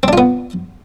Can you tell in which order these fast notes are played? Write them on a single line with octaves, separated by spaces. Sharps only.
C4 D4 F4 B3